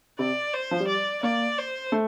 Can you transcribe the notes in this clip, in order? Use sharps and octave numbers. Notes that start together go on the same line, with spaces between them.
C3 D5
C5
F3
G3
D5
A#3 D5
C5
A3